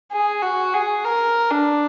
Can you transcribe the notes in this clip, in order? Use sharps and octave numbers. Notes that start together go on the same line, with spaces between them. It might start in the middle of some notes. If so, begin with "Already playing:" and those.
G#4
F#4
G#4
A#4
D4